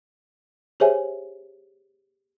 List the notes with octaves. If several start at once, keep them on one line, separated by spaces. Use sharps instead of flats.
G4 G#4 C5 C#5 E5 G#5